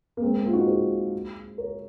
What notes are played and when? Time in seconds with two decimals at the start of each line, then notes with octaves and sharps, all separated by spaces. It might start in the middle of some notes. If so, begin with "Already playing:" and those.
0.17 A#3
0.22 G#3 C4
0.38 A#3
0.46 F4
0.53 D#4 F#4
0.67 G#4 C5
1.58 A#4 C#5